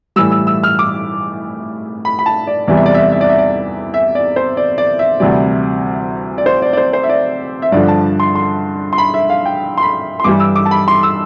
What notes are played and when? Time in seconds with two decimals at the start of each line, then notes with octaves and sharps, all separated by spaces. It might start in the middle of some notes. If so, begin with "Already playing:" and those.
0.16 A2 E3 G3 E6
0.32 E6
0.47 E6
0.64 F6
0.79 D6
2.05 B5
2.19 B5
2.26 A5
2.47 D5
2.68 E2 C3 E3 G3 D5
2.77 E5
2.86 D5
2.94 E5
3.03 D5
3.12 E5
3.21 D5
3.29 E5
3.38 D5
3.94 E5
4.15 D5
4.36 C5
4.57 D5
4.78 D5
4.99 E5
5.20 D2 C3 E3 G3 D5
6.38 D5
6.46 C5
6.62 D5
6.73 D5
6.77 C5
6.93 C5
7.03 E5
7.09 D5
7.62 E5
7.72 G2 D3 F3 D5
7.88 A5
8.20 C6
8.35 C6
8.93 C6
8.98 B5
9.14 E5
9.30 F5
9.46 G5
9.78 C6
9.82 B5
10.20 C6
10.24 G2 E3 G3 D6
10.40 E6
10.56 D6
10.65 A5
10.71 B5
10.88 C6
11.03 E6